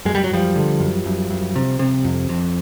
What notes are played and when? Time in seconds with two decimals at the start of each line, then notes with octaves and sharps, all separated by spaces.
0.05 F#2 G#3
0.15 G3
0.24 F#3
0.30 F#2 F3 G3
0.56 D3
0.80 F#2
1.05 F#2
1.30 F#2
1.56 C3
1.79 C3
2.04 F2
2.29 F2